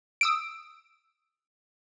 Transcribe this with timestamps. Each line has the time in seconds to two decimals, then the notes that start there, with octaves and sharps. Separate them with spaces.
0.21 D#6 E6 D7